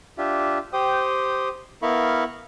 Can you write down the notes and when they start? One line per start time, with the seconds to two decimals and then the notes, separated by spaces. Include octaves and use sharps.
0.18 D4 F4 G4 E5
0.73 G4 C5 G5 D#6
1.82 B3 E4 A#4 F5 B5 C#6